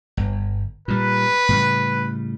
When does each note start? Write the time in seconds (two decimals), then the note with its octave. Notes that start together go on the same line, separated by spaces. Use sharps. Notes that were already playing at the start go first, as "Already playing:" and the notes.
0.17 G1
0.88 A#2 G3 B4
1.49 A2 C#3 G3